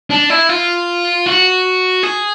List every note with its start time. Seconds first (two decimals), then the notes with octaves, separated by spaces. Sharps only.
0.10 D4
0.30 E4
0.49 F4
1.26 F#4
2.03 G#4